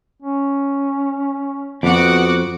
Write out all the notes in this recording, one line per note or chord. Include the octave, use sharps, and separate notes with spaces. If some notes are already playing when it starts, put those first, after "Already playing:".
C#4
F2 B3 F#4 F#5 D6